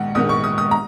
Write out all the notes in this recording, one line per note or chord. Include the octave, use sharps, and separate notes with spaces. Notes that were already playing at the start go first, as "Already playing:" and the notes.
Already playing: A#1 G#2 D#3 F#5
A#1 G#2 D#3 D#6
C#6
D#6
D#6
A#5